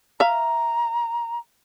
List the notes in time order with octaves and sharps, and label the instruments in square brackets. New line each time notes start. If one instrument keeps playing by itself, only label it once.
[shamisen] E5 F5 [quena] A#5